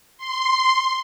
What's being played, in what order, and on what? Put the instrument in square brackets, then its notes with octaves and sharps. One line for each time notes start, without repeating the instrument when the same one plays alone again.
[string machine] C6